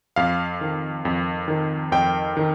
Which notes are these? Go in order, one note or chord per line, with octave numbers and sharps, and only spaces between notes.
F2 F5
D#3
F2
D#3
F2 G5
D#3